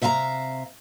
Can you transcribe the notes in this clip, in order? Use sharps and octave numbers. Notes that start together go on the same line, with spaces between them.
C3 E5 F5 A5 A#5